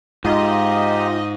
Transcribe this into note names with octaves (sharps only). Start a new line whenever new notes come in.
G#2 D#4 F4 G4 D#5